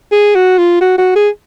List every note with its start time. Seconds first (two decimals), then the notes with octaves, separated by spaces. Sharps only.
0.12 G#4
0.35 F#4
0.58 F4
0.81 F#4
0.98 F#4
1.16 G#4